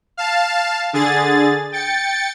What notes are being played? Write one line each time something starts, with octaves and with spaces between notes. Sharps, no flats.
F5 A5
D3 G#4 A6
G5 A6 C#7